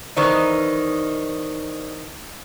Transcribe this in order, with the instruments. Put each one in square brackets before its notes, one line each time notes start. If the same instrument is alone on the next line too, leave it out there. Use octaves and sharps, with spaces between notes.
[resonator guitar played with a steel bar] D#3 E3 D#4 [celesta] C5 D5 C#6